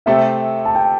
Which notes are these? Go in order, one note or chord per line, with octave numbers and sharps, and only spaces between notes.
C3 A3 C4 A4 E5
A5
G5